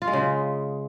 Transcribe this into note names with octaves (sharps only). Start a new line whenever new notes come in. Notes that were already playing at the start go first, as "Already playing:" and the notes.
F4
G#3
C#3